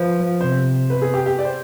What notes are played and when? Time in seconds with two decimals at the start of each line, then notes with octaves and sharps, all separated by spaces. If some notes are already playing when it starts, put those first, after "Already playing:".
Already playing: F3 B4 C5
0.41 C3 C5
0.90 B4
1.02 G#4
1.14 G4
1.26 G4
1.39 D5
1.45 C5